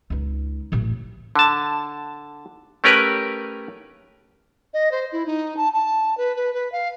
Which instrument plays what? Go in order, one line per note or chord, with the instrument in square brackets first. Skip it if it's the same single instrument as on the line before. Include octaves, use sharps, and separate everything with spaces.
[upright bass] C#2 D#4
A1 A2
[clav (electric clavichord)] D3 A5
A3 C#4 G4 A#4 B4
[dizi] D#5
C5
E4
D#4
A5
A5
B4
B4
B4
F5